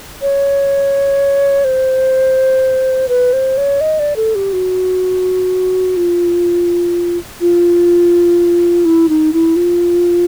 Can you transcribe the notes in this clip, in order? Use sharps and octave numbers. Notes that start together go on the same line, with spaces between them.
C#5
C5
B4
C5
C#5
D#5
D5
A4
G4
F#4
F4
F4
E4
D#4
E4
F4